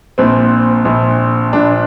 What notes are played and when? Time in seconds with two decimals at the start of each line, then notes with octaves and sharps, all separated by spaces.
0.18 A#1 A#2 C4
0.85 A#1 A#2
1.53 A#1 A#2 D4